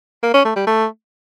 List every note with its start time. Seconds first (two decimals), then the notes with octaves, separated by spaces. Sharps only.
0.23 A#3
0.34 C#4
0.45 A3
0.56 G3
0.67 A3